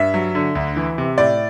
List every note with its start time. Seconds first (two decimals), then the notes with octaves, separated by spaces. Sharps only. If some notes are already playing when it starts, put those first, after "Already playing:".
Already playing: G2 E5
0.14 F#3
0.35 D3
0.55 D2
0.76 E3
0.98 C3
1.18 A2 D5